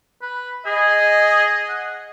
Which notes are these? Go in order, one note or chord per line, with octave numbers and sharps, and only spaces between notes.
B4
G#4 D#5
F#5